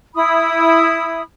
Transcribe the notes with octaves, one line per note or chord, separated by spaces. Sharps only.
E4 B5 D#6